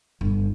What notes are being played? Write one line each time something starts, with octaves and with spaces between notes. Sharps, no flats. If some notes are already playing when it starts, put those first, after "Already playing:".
G1